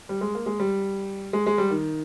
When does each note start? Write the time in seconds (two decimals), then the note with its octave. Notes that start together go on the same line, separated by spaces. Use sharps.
0.09 G3
0.21 G#3
0.35 A#3
0.46 G#3
0.60 G3
1.33 G#3
1.46 G#3
1.58 G3
1.70 D#3